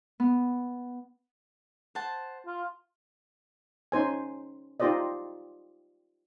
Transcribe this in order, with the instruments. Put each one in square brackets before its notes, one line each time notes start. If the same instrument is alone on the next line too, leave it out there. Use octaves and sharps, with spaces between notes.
[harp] B3
[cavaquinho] C5 F#5 A5
[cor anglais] F4
[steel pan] C#4 D#4 C5 G#5
D#4 F4 G4 C5 D5 D#5